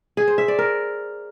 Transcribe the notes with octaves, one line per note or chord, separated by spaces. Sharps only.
G#4
C5
E5
D5
A#4